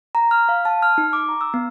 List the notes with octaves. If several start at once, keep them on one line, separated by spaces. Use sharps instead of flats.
A#5
F6
F5
A5
F6
D#4
D6
A#5
E6
B3